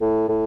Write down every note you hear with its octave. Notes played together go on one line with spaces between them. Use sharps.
A2
A2